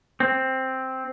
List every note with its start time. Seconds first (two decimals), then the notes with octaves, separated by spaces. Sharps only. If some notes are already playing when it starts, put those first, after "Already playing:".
0.20 C4